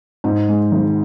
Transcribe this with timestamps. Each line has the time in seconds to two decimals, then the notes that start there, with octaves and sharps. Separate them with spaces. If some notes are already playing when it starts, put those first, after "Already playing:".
0.24 G#2
0.49 G#3
0.72 G#1